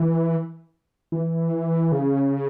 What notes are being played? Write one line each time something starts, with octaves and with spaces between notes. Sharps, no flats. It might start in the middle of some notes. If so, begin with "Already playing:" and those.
Already playing: E3
E3
C#3